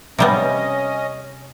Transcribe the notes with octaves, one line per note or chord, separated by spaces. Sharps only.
C3 G3 B3 C#4 D#5